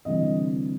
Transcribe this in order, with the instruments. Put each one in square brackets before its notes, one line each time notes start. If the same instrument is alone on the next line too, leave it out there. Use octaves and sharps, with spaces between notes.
[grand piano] D2 C3 E3 G3 C4 D#5